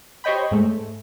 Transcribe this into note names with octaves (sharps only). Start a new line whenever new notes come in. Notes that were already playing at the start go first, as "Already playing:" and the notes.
G4 C5 C#5 D#5 G5 B5
G#2 G#3 A3